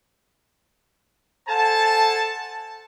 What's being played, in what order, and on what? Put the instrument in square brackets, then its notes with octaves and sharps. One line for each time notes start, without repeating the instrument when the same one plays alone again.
[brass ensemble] A4 C5 F#5 G#5 A5